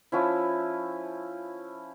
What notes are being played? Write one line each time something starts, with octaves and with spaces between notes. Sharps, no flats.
F3 C#4 E4